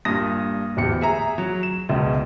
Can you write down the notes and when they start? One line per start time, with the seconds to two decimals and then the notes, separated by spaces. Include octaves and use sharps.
0.05 G2 A#2 D#6 A#6
0.77 D1 E2 G4 C#7
1.01 G#4 E5 A#5
1.38 F#3
1.63 E7
1.89 E1 C#2